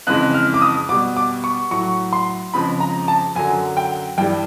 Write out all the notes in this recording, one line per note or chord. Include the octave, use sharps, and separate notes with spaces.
F2 C#3 E3 G#3 F#6
F6
D6
D#6
B2 G3 D6
D6
C#6
A2 F#3 C#6
C6
F2 C#3 F3 G#3 B5
A#5
A5
F#2 D3 F#3 G#5
G5
G2 E3 G3 G5